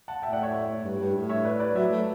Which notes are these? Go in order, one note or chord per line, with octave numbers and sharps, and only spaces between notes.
F#5 A5
A2 E5 G5
D5 F#5
C#5 E5
C#5 E5
G2
G2
A2
C#5 E5
B4 D5
B4 D5
F#3 C#5 E5
A3